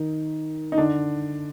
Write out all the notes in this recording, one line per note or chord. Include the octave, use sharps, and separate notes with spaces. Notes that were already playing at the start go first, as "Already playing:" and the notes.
Already playing: D#3 D#4
D#4
D3 D4